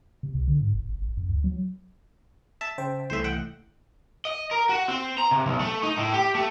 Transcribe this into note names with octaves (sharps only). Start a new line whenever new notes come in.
C3
C2
D3
G#2
G1
G1
G#1
F#2
D2
F#3
E5 A5
C#3 C5 G5
C2 E3 A3 C5 E5
F#5 G5
D#5
A#4
F#4
C4
A#5
C3
B1
A3
D#4
A2
G4
A3